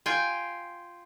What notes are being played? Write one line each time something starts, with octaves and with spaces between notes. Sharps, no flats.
F4 G5 G#5